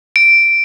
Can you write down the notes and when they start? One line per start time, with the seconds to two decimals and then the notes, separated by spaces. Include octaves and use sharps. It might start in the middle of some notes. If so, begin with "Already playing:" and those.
0.16 D7